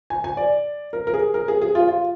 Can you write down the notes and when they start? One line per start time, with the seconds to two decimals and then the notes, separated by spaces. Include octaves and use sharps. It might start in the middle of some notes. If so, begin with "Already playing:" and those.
0.10 G#5
0.24 G#5
0.37 D5
0.93 A#4
1.07 A#4
1.14 G#4
1.34 A#4
1.48 G#4
1.62 G#4
1.75 F4
1.89 F4